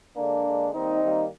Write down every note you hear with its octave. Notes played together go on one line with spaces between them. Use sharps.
D3 G#3 A#3 D4
D3 G#3
D#3 G3 A#3 C4 D#4
D#3 G3 A#3